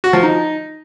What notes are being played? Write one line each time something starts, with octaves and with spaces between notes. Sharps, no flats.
F#4
F3
D#4